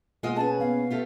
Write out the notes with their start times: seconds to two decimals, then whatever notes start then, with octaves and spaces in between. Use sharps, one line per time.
0.23 B2 G#3 A#3 F4 D#5 F#5
0.36 C#4 G#4 B4 A5
0.60 B3 F5
0.91 A3 F4 G4